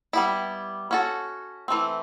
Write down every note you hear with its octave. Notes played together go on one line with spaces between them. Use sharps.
G3 B3 E4
C#4 F#4 A4
E3 A3 C4